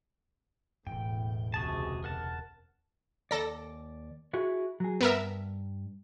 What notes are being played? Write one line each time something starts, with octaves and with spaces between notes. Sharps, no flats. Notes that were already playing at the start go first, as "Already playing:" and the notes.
E1 E2 A2 G5
C#2 C3 F#4 G#4 A5
A#4 F#5 A5
D#2 A4 D5 A#6
E4 F#4 G#4
F#3 G#4
G2 B3 A#4 E5